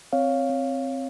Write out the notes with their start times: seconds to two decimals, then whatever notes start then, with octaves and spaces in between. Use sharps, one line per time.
0.13 C4 C#5 F5
0.50 C4